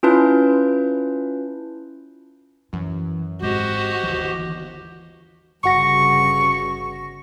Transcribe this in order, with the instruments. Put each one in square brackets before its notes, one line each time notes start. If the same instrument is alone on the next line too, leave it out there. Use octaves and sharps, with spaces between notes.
[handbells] C#4 E4 F4 B4 A5 G6
[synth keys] F#2 [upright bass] E3
[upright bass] G#1 [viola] F#4 [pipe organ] G4 C5 D#5
[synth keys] G1 D#2 [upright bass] E3
[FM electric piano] G1 F#4 A#6 [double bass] G2 C#3 [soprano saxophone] C#6